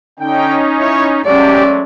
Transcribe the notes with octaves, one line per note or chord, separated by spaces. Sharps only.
D3 C#4 D#4 G5
E4 C#5
F#3 G#3 A3 C#4 G4 D5